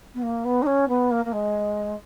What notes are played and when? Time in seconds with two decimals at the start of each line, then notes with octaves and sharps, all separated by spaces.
0.14 B3
0.22 A#3
0.44 B3
0.62 D#4
0.66 C#4
0.88 B3
1.10 A#3
1.24 A#3
1.32 G#3